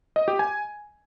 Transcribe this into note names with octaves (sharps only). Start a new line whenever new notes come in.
D#5
G4
G#5